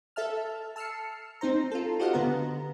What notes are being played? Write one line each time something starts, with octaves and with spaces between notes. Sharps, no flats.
A4 E5 A5 F6
A5 E6 F6 C7 C#7
C4 D#4 C5 A#5
F4 A4
F#4 G4 C5 D#5 F5 F#5
D3 B3 A#5